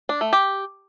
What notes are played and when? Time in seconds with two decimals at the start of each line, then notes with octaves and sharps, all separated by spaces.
0.09 D4
0.21 A3
0.33 G4